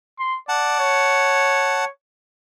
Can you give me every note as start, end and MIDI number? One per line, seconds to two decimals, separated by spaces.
0.19 0.38 84
0.49 0.77 74
0.49 1.85 78
0.49 1.85 81
0.80 1.90 73